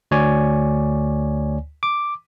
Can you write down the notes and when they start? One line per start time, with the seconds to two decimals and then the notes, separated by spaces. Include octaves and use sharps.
0.11 D2 C#5 D5 G#5
1.83 D6